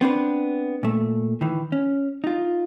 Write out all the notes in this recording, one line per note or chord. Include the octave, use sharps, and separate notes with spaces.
B3 C4 D4 B4
A#2 A3
D#3 E3
C#4
D#4 F4